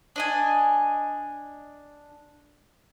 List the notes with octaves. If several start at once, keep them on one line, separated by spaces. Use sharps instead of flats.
D4 D#5 G#5